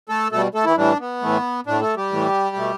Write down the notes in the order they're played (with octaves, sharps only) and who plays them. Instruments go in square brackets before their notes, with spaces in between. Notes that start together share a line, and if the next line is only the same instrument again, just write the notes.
[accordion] A3 A4
B2 G3 A3 A4
A3 A4
E3 E4
A2 E3 G3 D4
B3
A2 E3 A3
A2 A3 D4
A3 A4
G3 G4
A2 E3 A3
B2 A3